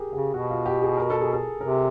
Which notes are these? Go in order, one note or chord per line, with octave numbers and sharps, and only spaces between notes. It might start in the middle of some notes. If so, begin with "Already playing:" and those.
Already playing: G4 G#4 A#4
C#3 G4
B2 F#4
F4
G4
G#4
A#4
A4
G#4
A4
C3 A#4